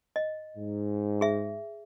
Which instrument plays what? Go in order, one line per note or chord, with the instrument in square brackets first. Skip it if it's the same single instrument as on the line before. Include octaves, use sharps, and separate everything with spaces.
[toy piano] D#5
[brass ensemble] G#2
[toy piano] G#4 E5